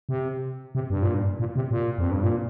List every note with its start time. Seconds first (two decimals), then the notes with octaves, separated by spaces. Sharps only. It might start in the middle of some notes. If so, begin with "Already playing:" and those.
0.09 C3
0.75 C3
0.90 G2
1.03 A#2
1.14 G2
1.40 A#2
1.56 C3
1.71 A#2
1.98 F2
2.11 G2
2.23 A#2